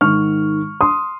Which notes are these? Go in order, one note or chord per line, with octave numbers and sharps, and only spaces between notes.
G#2 D#3 C#6 F6
C6 D#6